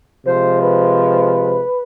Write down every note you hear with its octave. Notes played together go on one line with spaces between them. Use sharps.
C3 F3 G#3 C5
B4